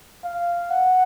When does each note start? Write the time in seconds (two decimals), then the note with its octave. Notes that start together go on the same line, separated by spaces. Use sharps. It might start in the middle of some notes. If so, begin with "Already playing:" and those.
0.24 F5
0.70 F#5